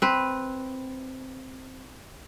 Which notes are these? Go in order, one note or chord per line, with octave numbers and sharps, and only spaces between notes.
C4 B4